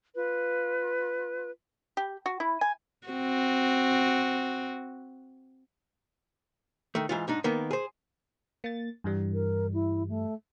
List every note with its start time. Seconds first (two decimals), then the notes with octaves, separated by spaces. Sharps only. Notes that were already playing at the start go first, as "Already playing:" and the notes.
0.16 F4 B4
1.97 G4
2.26 F#4
2.40 E4
2.61 G#5
3.07 C4 F#4
6.95 D#3 A3
7.09 G#2 E3 F4
7.28 G#2 D4 D#4
7.44 D#3 A#3 B3
7.71 G#4 C5
8.64 A#3 A6
9.04 G2 E3 G3
9.33 A#4
9.73 E4
10.08 A3